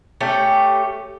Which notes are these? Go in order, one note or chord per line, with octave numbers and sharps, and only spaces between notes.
A3 C#4 G4